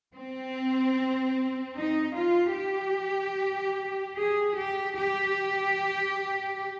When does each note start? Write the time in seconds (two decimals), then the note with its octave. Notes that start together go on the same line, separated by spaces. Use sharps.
0.14 C4
1.75 D#4
2.15 F4
2.56 G4
4.17 G#4
4.56 G4
4.97 G4